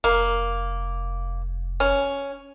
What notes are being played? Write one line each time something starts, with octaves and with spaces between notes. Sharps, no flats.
F1 A#3
C#4